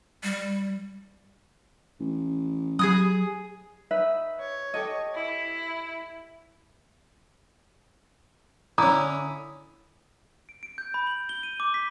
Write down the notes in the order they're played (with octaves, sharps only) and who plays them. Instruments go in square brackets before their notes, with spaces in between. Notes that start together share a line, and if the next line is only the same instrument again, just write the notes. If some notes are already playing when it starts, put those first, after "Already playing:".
[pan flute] G3
[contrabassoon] A1
[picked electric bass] F#3 [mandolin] G#4 G#5 D#6
[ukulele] D#4 B4 E5
[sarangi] C#5
[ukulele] G4 A4 D#5
[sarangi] E4
[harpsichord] D3 C#4 [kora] E4 [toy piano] A#5 [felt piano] D#6
[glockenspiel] D7
D7
G6
B5
F#7
G7
D#7
D6
B6